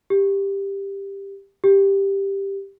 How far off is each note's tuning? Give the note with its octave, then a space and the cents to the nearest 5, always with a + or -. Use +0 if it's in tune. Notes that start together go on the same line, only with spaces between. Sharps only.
G4 +10
G4 +5